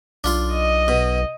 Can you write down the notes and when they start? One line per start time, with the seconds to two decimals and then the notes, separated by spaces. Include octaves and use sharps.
0.24 B1 D4 F4 C6
0.53 D#5
0.88 B2